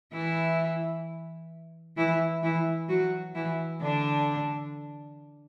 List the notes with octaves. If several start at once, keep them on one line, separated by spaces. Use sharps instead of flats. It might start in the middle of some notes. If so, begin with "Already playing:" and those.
E3 E4
E3 E4
E3 E4
F#3 F#4
E3 E4
D3 D4